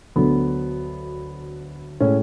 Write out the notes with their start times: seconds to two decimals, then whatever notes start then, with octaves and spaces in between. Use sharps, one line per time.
0.16 D2 D3 F#3 B3
2.00 A2 G#3 C#4